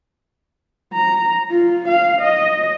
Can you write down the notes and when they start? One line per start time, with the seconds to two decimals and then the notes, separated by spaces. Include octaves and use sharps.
0.93 A#5
1.50 F4
1.88 F5
2.21 D#5